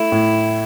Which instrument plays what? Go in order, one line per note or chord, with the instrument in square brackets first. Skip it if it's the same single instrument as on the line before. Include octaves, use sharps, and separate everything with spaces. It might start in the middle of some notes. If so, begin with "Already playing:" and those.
Already playing: [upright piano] A3 [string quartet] E4
[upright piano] A2